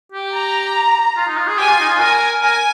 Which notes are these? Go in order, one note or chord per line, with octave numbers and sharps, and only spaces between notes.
G4
A#5
F4
D#4
F4
G#4
G4 G#5
F4
D#4
F4
A#4 G#5
A#4 G#5